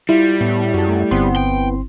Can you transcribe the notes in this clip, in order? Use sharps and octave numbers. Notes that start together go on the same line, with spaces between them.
G3 E4 F4
A2 B3
F#2 F#4 G#4 A5
A3
G1 B3 C4 C6
G5